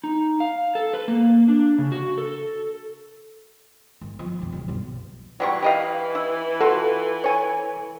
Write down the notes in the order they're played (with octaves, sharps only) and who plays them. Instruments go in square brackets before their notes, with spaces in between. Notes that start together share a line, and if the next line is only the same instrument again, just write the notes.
[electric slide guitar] D#4
F5
A4
B4
A#3
D4
C#3
F#4
A4
[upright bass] G#1
F3
B1 F2
C#3 F#3
B1 G2
[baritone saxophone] E3 [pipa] F#3 G3 C#6
[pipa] G4 D#5 F5
E4
[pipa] F4 F#4 [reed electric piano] A4
[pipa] C#5 G#5